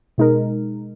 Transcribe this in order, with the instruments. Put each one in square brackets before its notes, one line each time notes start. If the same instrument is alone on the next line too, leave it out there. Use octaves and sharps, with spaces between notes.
[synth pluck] B2 G#3 D#4 A#4